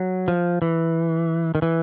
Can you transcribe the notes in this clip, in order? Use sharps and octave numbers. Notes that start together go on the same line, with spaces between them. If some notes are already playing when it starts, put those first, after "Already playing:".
Already playing: F#3
F3
E3
D#3
E3